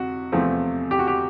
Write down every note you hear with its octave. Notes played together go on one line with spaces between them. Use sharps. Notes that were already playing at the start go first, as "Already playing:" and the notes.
Already playing: F2 C3 F#4
E2 C3 F3 A3 C4
G4
F#4
G4